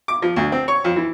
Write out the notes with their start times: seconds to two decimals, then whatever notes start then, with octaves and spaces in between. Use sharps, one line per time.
0.08 D6
0.22 F3
0.36 D2
0.52 C4
0.68 C#5
0.84 F2
0.96 E3